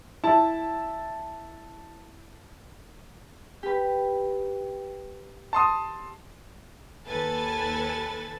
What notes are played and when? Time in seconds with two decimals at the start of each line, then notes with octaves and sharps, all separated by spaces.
0.24 E4 A5
3.63 G4 B4
5.53 A5 C6 D#6
7.07 D#2 A4 B4 G#5 A6